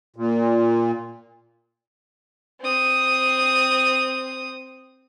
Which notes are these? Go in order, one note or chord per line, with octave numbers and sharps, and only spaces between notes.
A#2
C4 D#6